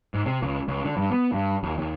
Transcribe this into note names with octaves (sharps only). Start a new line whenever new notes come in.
G#2
C3
C#2
C#2
D3
G2
B3
G2
D#2
D#2